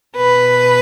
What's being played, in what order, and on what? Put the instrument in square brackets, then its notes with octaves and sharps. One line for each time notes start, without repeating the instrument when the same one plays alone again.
[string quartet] B2 B4